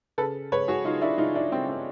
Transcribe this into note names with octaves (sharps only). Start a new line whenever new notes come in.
C#3 A4 B4
C#3 B4 C#5
F#4 G#4
C#3 D#4 F4
D4 E4
C#3 D#4 F4
D4 E4
C#3 C4
C4